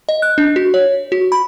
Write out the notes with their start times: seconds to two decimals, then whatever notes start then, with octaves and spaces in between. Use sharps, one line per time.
0.09 D#5
0.22 F#6
0.38 D4
0.56 F#4
0.74 C#5
1.12 F#4
1.32 B5